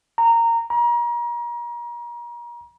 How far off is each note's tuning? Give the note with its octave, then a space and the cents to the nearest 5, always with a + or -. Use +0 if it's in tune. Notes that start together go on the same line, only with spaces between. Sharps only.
A#5 -15
A#5 +35